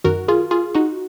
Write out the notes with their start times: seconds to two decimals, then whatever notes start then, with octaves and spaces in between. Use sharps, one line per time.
0.04 F#2 D#3 F#4 A#4
0.28 F4 G#4
0.51 F4 G#4
0.75 D#4 F#4